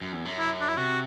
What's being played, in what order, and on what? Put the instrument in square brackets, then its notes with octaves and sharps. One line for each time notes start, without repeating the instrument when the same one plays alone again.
[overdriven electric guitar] F#2
E2
F#2
[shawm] E4
D4
E4
[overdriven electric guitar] C3 [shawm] F#4